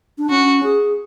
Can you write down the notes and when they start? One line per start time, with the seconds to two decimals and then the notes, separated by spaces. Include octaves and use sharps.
0.18 D4
0.30 C#4 F#4
0.63 G#4